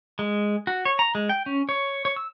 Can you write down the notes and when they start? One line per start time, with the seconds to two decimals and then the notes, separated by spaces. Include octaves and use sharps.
0.19 G#3
0.67 F#4
0.85 C#5
0.99 A#5
1.15 G#3
1.29 G5
1.46 C#4
1.69 C#5
2.05 C#5
2.16 E6